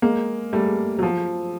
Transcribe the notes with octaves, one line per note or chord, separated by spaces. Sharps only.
G#3 A#3
G3 A3
F#3
F3